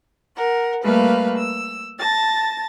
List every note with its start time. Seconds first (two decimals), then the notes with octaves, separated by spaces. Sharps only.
0.35 A#4 F#5
0.83 G3 A3 A#3 B4 F5
1.36 E6
1.98 A5 A6 A#6